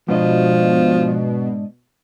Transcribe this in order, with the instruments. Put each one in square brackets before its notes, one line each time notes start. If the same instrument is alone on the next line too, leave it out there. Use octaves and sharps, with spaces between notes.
[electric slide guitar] G#2 D4 D#5 [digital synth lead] B2 [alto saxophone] F3